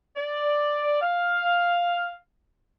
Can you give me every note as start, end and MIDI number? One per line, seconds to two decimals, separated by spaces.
0.16 0.98 74
1.02 2.14 77